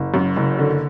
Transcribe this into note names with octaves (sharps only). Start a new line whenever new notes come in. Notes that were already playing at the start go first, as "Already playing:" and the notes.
Already playing: F#1
F#2
F#1
D3